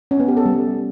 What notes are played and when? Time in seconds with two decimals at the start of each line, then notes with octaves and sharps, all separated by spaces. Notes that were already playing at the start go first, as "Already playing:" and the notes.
0.11 C#4
0.20 B3
0.28 G4
0.37 A4
0.46 G3